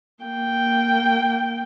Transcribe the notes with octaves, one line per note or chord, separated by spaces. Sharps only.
A#3 G5